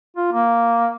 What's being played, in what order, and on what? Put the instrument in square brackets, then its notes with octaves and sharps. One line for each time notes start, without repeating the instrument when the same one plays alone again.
[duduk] F4
A#3